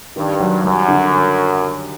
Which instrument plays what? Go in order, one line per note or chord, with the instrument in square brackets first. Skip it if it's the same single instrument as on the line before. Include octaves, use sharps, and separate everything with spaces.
[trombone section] G2 [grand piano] D#3
[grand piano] F#3
[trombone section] F#2 [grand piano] G3
[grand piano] D3